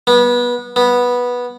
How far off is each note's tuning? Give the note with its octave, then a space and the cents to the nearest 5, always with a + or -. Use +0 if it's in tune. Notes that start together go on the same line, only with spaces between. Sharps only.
B3 -25
B3 -10